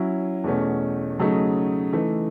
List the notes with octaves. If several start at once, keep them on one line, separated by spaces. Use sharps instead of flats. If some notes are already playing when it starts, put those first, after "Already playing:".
Already playing: F#3 C#4 E4
E2 B2 A3 C#4
C#3 F#3 A3 D#4
E3 A3 D#4